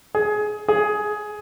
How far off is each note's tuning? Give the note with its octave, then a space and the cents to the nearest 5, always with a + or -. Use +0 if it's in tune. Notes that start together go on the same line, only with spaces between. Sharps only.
G#4 +20
G#4 +15